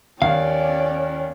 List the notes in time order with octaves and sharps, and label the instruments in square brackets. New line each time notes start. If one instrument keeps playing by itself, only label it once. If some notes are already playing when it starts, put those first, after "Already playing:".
[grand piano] D#2 [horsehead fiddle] C#4 [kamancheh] D5 G5 [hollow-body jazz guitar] F5